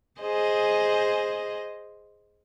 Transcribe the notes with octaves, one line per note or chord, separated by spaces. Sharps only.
G#4 C5 D#5